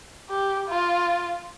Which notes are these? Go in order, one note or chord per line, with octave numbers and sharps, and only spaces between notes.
G4
F4